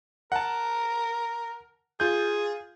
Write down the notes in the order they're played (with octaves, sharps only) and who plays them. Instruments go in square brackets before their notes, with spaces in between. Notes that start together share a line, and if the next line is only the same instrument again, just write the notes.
[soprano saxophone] A#4 [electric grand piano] F#5 A5
[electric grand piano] F4 G6 [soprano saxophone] G#4